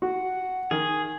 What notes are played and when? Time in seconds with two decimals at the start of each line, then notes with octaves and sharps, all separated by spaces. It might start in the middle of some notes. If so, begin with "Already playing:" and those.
0.02 F#4 F#5
0.71 D#3 G#4